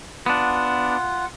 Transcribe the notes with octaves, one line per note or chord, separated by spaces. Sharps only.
B3 D4 F4 F#5